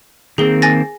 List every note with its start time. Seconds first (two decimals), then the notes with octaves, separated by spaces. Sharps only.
0.38 D#3 A#3 C4 G#4 G7
0.62 G#5 A6 A#6